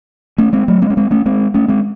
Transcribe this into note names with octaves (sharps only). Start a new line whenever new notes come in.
A3 C#4
G#3 C4
F#3 A3
G#3 C4
C#4
G#3 C4
A3 C#4
G#3 C4
A3 C#4
G#3 C4